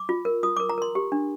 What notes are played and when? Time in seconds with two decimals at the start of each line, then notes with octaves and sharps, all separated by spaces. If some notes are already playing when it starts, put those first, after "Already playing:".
Already playing: D6
0.09 F4
0.25 A#4
0.43 F4 D#6
0.57 A#4 D6
0.69 A#5
0.78 A#4 C6
0.95 G4
1.12 D4